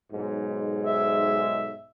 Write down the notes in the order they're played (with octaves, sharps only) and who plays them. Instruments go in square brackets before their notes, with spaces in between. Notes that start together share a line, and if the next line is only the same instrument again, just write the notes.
[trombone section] B1 G#2
[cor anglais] E5